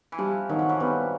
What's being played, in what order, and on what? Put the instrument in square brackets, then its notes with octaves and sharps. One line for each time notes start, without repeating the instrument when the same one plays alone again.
[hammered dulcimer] E3
[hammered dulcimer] F3 [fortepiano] G3
[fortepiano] D#3 [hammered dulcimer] F#3
[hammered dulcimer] F3
E3 F#3
[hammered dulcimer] F3 G3 [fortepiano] B3